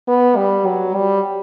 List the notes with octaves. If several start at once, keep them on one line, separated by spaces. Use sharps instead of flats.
B3
G3
F#3
G3